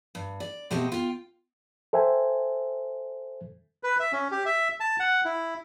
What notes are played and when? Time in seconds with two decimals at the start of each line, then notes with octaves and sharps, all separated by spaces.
0.15 G2
0.40 D5
0.71 B2 A3 C4 G4 D#5
0.92 F4 G5
1.93 A4 C5 E5 G5 G#5
3.83 B4
4.00 E5
4.13 C#4
4.31 G4
4.46 E5
4.80 A5
4.99 F#5
5.25 E4